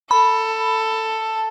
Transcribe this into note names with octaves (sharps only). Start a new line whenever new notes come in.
A4 B5